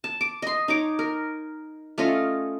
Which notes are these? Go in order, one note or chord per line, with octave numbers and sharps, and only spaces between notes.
A5
D6
D#5 C6
D#4 C#5 D6
A#4
A3 C#4 F4 D#5